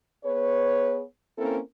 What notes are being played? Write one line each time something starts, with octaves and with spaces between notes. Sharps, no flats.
B3 G#4 B4 C#5
A#3 C4 C#4 E4 A4 A#4